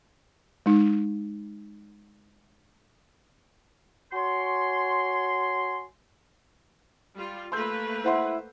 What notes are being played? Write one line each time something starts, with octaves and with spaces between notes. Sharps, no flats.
G#3 D#4
F#4 C#5 G#5 C6
G3 F4
A3 A#3 B4 C6 E6 G6
E4 C5 F#5 C6